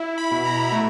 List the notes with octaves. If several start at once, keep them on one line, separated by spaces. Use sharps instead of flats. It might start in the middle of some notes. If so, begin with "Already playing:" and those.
Already playing: E4
B5
B2
A#5
A3